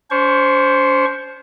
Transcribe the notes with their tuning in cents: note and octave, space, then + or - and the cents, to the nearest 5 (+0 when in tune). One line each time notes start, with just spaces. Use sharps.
C#4 +45 C5 +0 C#6 +0